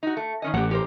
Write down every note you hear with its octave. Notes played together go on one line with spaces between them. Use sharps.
D#4 F#4
A3
D#3 C#4 D#5
A1 G4 F#5
G4 A#4 C5